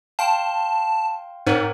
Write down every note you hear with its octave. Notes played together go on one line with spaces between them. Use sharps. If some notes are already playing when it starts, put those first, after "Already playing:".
F5 G5 A5 C6
G#2 C4 A#4 C#5